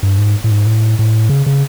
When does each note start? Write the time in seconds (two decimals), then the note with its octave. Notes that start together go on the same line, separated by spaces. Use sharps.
0.03 G2
0.18 G#2
0.44 A2
0.51 G#2
0.66 A2
0.99 A2
1.29 C#3
1.46 C#3